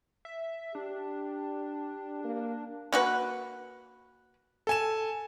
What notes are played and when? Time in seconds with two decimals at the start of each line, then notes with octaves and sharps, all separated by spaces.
0.25 E5
0.75 D4 G4
2.24 A#3
2.93 A#3 F#4 B4
4.67 A4 G#5 E7